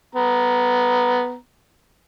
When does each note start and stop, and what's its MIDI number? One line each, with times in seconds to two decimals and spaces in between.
0.15 1.35 59
0.15 1.35 82